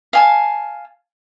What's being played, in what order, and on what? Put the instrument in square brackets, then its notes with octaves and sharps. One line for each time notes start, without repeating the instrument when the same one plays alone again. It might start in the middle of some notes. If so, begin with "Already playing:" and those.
[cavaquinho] F5 G#5 A5